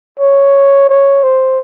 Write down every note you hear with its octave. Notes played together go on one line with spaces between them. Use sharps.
C#5
C#5
C5